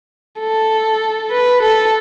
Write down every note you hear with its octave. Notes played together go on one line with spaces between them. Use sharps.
A4
B4
A4